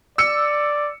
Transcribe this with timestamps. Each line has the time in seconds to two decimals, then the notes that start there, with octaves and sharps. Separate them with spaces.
0.18 D5 E6 C#7